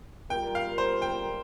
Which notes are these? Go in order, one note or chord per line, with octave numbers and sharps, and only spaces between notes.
G3 A#3 F4 A#4 G5
F5
C5
G5